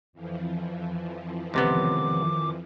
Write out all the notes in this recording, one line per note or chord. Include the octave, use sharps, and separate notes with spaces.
F2 E3 F3
C#2 C3 D#3 B3 D6